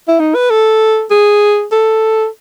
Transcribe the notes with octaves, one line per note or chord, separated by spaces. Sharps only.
E4
D#4
B4
A4
G#4
A4